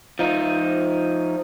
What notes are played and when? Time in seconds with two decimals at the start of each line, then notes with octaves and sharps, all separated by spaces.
0.19 F3 D#4